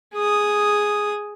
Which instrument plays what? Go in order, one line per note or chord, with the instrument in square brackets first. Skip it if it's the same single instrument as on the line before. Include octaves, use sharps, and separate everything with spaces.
[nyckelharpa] G#4 D#6